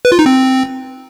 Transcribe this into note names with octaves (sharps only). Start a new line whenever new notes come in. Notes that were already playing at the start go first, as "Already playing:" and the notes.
B4
F4
D#4
C4